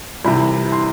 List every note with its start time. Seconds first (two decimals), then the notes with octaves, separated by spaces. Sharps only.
0.25 C2 C3 E3 B5
0.72 C6